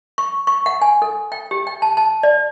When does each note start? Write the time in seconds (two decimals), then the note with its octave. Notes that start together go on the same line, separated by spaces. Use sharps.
0.18 C#6
0.47 C#6
0.66 F#5
0.82 G#5
1.02 A4
1.32 G5
1.51 G4
1.67 G5
1.82 A5
1.97 A5
2.23 D5